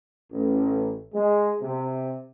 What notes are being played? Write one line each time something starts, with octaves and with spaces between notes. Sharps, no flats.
A1
G#3
C3